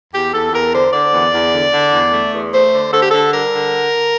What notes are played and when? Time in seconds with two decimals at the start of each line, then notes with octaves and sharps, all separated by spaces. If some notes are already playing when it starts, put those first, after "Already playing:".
0.13 E2 G4
0.32 E2 A4
0.52 E2 A#4
0.72 D3 C5
0.93 D3 D5
1.12 E2
1.32 E2
1.52 D3
1.72 D3
1.92 E2
2.12 A3
2.32 E2
2.52 A3 C5
2.72 D3
2.91 D3 A4
3.00 G4
3.09 D3 A4
3.31 G3 A#4
3.51 D3